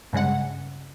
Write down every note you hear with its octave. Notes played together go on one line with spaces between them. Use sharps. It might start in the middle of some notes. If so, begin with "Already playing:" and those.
G2 C#3 G#3 F#5